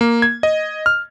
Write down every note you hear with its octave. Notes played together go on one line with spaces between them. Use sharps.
A#3
G#6
D#5
F6